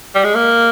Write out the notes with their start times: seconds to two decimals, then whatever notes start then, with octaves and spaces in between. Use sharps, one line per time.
0.15 G3
0.24 G#3
0.35 A#3